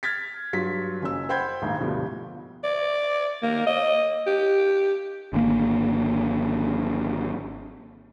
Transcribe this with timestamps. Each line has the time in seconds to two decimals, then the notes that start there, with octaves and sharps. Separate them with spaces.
0.03 F6 G#6 A6 B6
0.53 G2 F#3 F4 B6
1.02 F#1 C#3 C#4 E6
1.29 C5 F#5 G5 B5 G6 G#6
1.62 A#1 D#2 G#2
1.79 D2 G2 B2 F3 G3
2.64 D5
3.43 A#3
3.67 D#5
4.27 G4
5.33 G#1 D3 A#3